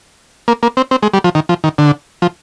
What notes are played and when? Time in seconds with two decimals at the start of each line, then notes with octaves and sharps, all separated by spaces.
0.48 A#3
0.63 A#3
0.77 C4
0.91 C4
1.03 G#3
1.14 G3
1.24 F3
1.35 D#3
1.49 F3
1.64 D#3
1.78 D3
2.22 F3